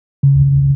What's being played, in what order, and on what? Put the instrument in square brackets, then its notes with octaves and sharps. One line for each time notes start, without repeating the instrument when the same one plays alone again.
[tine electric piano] C#3